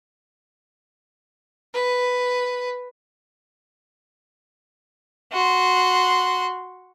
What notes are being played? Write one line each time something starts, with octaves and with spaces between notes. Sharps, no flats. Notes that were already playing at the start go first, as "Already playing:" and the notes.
B4
F#4 C6